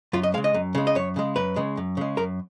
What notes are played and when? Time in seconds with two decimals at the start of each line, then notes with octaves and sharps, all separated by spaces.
0.13 F#2 F4
0.23 D#5
0.34 G#3 F5
0.38 C#3
0.44 D#5
0.54 F#2
0.75 C#3 G#3
0.87 D#5
0.95 F#2 C#5
1.16 C#3 G#3
1.36 F#2 B4
1.56 C#3 G#3
1.77 F#2
1.97 C#3 G#3
2.17 F#2 A#4